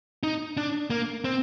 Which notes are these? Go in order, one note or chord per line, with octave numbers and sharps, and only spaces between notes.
D#4
D4
A#3
C4